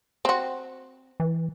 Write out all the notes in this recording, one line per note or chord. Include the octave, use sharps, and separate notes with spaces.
C4 F#4
E3